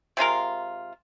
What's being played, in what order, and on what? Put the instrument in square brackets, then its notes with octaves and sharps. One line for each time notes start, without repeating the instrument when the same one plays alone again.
[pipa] C3 G#3 F4 A#4